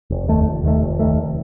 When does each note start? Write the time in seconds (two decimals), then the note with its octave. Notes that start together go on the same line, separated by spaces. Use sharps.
0.10 F1
0.28 D#2 D#3 A3
0.46 F1
0.64 D#2 D#3 A3
0.81 F1
0.99 D#2 D#3 A3
1.17 F1